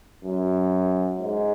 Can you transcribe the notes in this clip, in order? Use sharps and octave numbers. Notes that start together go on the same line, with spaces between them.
F#2
G#2